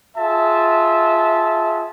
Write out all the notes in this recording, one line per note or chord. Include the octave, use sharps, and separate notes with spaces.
F4 G#4 E5 A5